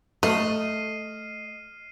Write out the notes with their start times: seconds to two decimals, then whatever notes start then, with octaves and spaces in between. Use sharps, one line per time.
0.23 A3 D#5 F6 C7 D#7